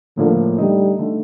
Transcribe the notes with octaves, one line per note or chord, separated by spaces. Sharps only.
A2 D3 F3 A#3
D3 G3 A3 D#4
D3 A3 D#4